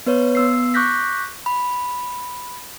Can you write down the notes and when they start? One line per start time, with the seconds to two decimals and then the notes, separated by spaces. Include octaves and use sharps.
0.06 B3 B4 C#5
0.35 B3 E6 C7
0.74 C#6 D6 F#6 G6 A#6 B6
1.46 B5